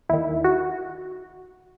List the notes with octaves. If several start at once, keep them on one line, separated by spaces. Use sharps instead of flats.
D#2 D#3 E4
F#4